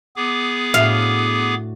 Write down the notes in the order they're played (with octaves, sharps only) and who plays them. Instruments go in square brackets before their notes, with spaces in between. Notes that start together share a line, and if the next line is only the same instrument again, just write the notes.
[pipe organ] B3 G#4 D6
[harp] A2 D4 F#4 [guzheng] F5